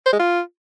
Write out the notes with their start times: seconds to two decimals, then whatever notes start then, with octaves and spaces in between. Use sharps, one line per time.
0.06 C5
0.13 G#3
0.19 F4